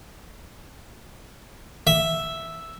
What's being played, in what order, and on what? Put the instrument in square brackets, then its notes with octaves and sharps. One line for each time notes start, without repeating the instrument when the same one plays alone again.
[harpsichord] E5